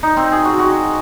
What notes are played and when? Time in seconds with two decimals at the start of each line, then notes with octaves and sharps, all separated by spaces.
0.03 D#4
0.17 C4
0.32 G#4
0.45 F#4
0.59 F#4